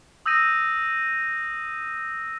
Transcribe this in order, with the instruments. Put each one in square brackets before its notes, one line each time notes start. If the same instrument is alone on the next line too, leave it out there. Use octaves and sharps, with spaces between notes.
[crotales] D#6 E6 G6 A#6 D#7